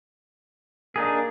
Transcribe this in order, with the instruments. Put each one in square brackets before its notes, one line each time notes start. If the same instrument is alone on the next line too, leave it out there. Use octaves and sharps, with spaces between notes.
[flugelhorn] A#3 [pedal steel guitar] D4 D#4 G#4